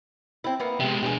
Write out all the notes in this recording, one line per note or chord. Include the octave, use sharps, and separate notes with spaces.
C4 E4
A#3 B3 E4
C3 G#3 B3
B2 D4 G4 G#4